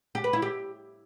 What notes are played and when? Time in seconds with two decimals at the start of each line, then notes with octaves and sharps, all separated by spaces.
0.15 G4
0.24 B4
0.33 E4
0.42 G4